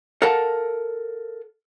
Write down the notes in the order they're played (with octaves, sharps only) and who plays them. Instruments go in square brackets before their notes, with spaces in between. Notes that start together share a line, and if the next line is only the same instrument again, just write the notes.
[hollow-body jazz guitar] A4 A#4 F5 F#5 A5